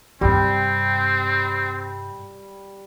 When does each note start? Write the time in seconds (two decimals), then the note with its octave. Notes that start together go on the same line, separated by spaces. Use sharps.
0.21 G2 C3 G3 C4